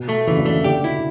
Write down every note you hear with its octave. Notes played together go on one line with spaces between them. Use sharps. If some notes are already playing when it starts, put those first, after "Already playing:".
Already playing: B2
A3
C#3 E3
D3
C#3 A3
D3 G4
E4